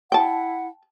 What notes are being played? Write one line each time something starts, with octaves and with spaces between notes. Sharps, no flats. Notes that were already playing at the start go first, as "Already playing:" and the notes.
E4 F#5 G5 A5